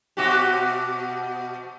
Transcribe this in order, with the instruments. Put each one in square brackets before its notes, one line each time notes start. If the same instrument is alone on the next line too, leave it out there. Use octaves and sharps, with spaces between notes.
[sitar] B2 F#4 G4